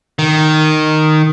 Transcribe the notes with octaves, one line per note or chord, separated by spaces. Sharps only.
D#3